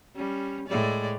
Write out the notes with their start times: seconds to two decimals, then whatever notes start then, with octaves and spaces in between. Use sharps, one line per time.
0.16 G3 C#4
0.68 A2 G#3 D5